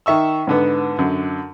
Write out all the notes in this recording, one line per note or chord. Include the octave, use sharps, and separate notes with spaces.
D#3 E5 C#6 E6
G#2 D3 B3
F#2 D3